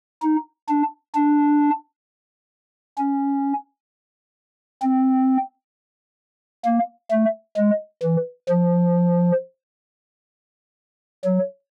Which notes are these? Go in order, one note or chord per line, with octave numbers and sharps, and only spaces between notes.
D#4
D4
D4
C#4
C4
A#3
A3
G#3
E3
F3
F#3